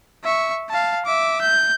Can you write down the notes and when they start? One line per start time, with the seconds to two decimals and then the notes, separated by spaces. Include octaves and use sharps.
0.24 E5 C#6
0.69 F5 A5
1.06 E5 D6
1.41 G6